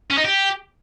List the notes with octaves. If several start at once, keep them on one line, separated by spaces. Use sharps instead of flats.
C#4
D#4
G4